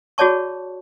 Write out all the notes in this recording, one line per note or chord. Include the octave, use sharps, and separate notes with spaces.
F#4 G#4 C#5 D5 A5 C#6